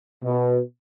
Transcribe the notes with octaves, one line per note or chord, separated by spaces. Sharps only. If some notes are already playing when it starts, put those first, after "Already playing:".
B2